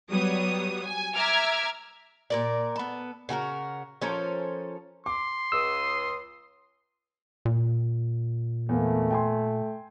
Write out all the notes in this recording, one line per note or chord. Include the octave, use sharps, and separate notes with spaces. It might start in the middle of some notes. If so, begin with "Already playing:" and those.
F#3 G3 B3 C#5 D#6
G#5
E5 A#5 D6 E6 F6 G#6
A#2 A#4 D5
B3 A4
C#3 F#4 A4 A#4
F3 C#4 A4 A#4
C6 D6
C#2 D#6 E6
A#2
E2 A3 A#3
G5 G#5 C6